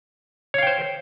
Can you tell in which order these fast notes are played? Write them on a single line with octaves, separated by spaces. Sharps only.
C#5 F5 G5 C5